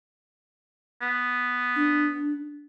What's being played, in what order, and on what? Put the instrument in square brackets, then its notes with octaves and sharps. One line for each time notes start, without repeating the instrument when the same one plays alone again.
[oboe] B3
[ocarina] D4